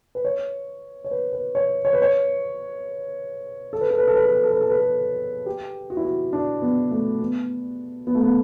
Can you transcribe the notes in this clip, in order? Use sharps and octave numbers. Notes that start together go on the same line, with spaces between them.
B4
C#5
C#5
B4
B4
C#5
C#5
B4
C#5
A4
B4
A4
B4
A4
B4
A4
B4
A4
B4
A4
B4
A4
G4
F#4
E4
F#4
D4
B3
A3
B3
B3
A3
B3